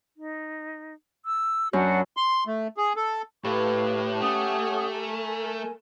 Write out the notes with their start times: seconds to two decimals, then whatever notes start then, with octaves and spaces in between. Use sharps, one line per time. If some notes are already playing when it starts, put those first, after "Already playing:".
0.16 D#4
1.24 E6
1.73 F#2 D4 F#4 F#5
2.17 C6
2.47 A3
2.77 G#4
2.96 A4
3.44 A2 G4 A4 B4 F5 C#6
4.21 A3 C#4 F#5 D#6
4.91 A#4 G#5